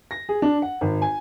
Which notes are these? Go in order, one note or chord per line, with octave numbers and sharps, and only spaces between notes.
A#6
G#4
D4
F#5
G#1
G#5